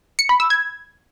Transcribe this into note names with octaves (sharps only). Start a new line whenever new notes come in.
C#7
B5
E6
G#6